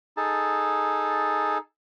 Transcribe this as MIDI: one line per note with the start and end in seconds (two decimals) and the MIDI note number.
0.17 1.58 63
0.17 1.58 68
0.17 1.58 69
0.17 1.58 81